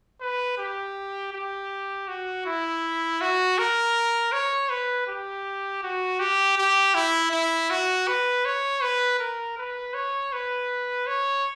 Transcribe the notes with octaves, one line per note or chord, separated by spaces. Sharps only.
B4
G4
G4
F#4
E4
F#4
A#4
C#5
B4
G4
F#4
G4
G4
E4
E4
F#4
B4
C#5
B4
A#4
B4
C#5
B4
C#5